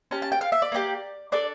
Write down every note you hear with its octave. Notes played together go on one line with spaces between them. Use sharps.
C#4 G4 A5
A5
G5
F5
E5
D5
A#3 D4 G4
D4 A4 D5